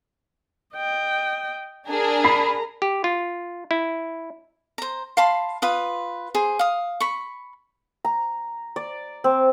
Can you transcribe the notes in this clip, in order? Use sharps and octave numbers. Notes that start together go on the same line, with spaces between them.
D#5 G5
D4 G#4 A#4 A#5
B5 B6 C7
G4
F4
E4
C5 A#5
F5 A5 B5 C6
F4 B4 D#6
G#4 C5
F5 D#6
B5 C#6
A#5
D5
C4